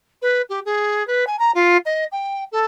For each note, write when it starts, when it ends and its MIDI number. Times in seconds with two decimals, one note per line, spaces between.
0.22 0.42 71
0.49 0.60 67
0.65 1.06 68
1.07 1.25 71
1.27 1.37 80
1.39 1.51 82
1.55 1.77 65
1.86 2.05 75
2.12 2.44 79
2.52 2.65 69